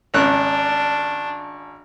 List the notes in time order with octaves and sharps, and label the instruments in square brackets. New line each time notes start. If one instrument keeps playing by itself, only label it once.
[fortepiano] G#1 C#3 F#6 [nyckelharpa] D4